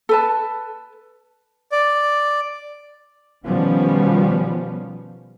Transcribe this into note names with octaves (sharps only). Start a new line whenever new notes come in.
A4 B4 A5
D5
B2 D#3 F3 G3 B3 C#4